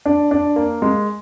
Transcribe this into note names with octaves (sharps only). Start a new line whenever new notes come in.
D4
D4
A#3
G#3